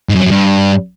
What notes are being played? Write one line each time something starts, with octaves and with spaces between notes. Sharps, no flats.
G#2
F#2
F#3
F#2
G2